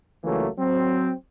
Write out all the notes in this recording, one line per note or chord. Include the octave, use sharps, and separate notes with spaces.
C#2 E3 F#3 A3 A#3
F#3 C4